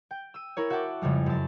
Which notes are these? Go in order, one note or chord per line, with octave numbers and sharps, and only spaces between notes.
G5
E6 D#7
E4 A#4 C#5
F#4 E5 F#5 G5 A5 D6
F2 C#3 G3 G#3
F#2 A5